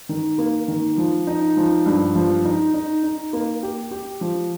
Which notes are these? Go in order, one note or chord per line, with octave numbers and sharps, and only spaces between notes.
D#3
A#3
D#3
F3
D#4
F3
G2
F3
D#4
D#4
D#4
A#3
G4
G4
F3